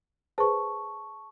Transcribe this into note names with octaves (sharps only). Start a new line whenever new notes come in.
G#4 B4 C5 A5 C#6